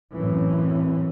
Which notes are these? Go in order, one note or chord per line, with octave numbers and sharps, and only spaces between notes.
F#2 A2 E3 C4 C#4